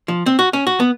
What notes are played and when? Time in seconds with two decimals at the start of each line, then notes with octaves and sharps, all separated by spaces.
0.08 F3
0.26 C4
0.39 F#4
0.53 C#4
0.67 F#4
0.80 B3